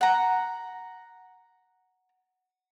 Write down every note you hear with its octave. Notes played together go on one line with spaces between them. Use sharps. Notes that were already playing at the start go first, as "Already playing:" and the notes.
F#5 A#5